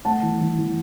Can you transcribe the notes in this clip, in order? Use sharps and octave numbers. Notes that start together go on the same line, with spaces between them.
A3 F#5 A5
E3
E3
E3